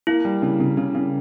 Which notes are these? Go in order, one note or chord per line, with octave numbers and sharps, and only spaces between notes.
A#3 E4
G3
C#3
C#3
C#3
C#3